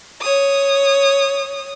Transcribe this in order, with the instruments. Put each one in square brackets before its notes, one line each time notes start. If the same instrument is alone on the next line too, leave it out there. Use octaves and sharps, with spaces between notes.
[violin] C#5 D#6